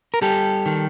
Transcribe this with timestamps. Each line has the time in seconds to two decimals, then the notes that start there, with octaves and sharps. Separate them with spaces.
0.14 A#4
0.22 G3 G4 A4
0.66 D#3